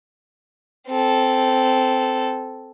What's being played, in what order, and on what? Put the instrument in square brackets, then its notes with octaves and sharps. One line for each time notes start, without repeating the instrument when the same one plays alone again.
[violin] C4 A4